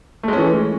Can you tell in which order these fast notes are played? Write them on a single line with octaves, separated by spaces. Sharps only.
A3 G#3 C#4 E3